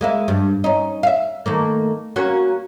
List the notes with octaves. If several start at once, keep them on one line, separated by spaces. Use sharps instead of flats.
G#3 A#3 E4
G2
C#4 D#4
E5 F5
D#3 A3 A#3
A#3 C#4 F#4